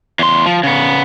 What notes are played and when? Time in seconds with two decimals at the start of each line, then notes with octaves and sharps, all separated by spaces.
0.19 E2 C6
0.46 F3
0.63 C#3 B3